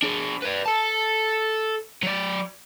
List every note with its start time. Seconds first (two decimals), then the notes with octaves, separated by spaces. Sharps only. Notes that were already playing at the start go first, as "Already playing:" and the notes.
0.03 D4 G#4
0.42 B4 D5
0.66 A4 A5
2.03 F#3 D5